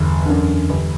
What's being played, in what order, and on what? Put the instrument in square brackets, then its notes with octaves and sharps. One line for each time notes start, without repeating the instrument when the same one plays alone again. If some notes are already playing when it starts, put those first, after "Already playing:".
Already playing: [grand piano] G1 [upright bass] E2
[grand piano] F#2 D3
G1